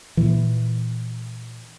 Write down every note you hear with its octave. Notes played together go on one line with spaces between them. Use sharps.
A#2 E3